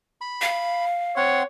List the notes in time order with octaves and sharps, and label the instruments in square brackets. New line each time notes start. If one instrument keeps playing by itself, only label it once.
[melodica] B5
[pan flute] F5
[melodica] C4 F#5 C6 [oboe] C#5